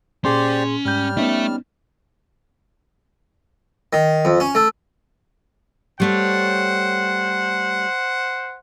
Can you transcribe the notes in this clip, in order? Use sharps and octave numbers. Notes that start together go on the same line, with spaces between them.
A#2 C#4 G4 G#4 C5 D5 C6
G#2 G3 F6 G6
A3 B3 C#4 D#4 E5
D#3
F2
C#4
A3
G3 A3 C5 C#5 F#5